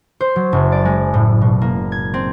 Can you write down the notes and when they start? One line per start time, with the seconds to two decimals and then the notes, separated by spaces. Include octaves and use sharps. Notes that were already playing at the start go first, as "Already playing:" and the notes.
0.21 C5
0.36 F#3
0.52 F#1
0.72 D5
0.85 G#3
1.14 A2
1.41 B2
1.62 A#3
1.92 G#6
2.14 C4